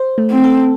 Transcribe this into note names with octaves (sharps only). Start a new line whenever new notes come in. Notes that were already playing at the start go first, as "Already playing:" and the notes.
Already playing: C5
A3
C4
A4